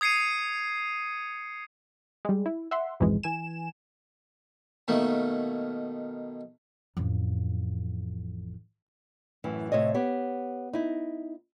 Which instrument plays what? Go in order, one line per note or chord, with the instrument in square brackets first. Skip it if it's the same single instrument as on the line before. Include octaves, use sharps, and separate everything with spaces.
[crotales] D#6 G#6 C7 C#7 D#7
[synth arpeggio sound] G3 G#3
E4
E5 F#5 C6
A#1 F2 G#2 B2 E3 G#3
E3 G#5 E7
[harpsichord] B2 D#3 A3 A#3
[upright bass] A1 F2
[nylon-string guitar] F#2 A2 E3
A2 C3 C#5 D#5
B3 G4 C#5
D#4 E4